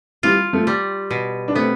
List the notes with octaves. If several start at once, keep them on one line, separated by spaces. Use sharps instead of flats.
E3 G3 F4
F3 A3
G3
B2
D4
A3 B3 C4